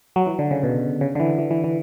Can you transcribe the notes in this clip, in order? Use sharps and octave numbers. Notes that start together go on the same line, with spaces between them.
F#3
E3
D3
C#3
B2
C#3
D3
E3
E3
E3
E3